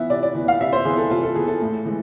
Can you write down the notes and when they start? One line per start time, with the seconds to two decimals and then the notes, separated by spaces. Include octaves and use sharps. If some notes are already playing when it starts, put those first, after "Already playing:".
Already playing: E3 B3 E5
0.10 C3 D5
0.23 D5
0.35 E3 B3
0.48 F5
0.60 C3 E5
0.73 C5
0.85 E3 B3 G#4
0.97 A4
1.11 C3 F4
1.23 A4
1.35 E3 B3 G#4
1.47 A4
1.61 A2
1.85 E3 G#3